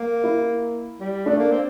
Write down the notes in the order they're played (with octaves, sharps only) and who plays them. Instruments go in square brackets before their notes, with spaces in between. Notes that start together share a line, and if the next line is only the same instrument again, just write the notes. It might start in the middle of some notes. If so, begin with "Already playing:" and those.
Already playing: [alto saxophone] A#3
[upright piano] E4
[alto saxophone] G3
[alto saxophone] A3 [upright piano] D4
[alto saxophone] A#3
C4